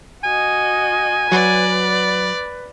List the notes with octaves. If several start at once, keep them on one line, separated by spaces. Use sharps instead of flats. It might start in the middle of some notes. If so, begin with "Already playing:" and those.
F#4 D#5 G#5
F#3 B4 D5